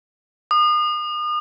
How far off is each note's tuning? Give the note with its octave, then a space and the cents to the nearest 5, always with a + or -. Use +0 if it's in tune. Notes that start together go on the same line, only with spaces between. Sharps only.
D#6 -40